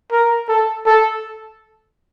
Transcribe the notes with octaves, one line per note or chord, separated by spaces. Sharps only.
A#4
A4
A4